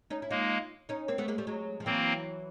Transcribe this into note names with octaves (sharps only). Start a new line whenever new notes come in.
C#4 D#4
E4
G#3 A#3 D#4 F4
C#4 D#4
A#3 C4
A3 B3
G#3 A#3
G3 A3
F#3 G#3
F3
E3 F#3 A#3 C4